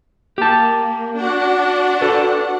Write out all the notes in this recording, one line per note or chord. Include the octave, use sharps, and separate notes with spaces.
A#3 G4 A5
D4 F#4 F#5
G4 A4 B4